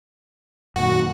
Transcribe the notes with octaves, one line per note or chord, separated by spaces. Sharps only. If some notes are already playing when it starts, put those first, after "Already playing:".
F#2 A#2 D#3 F#4